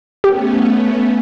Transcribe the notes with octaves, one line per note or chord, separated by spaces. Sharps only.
A3 B3 C#4 G4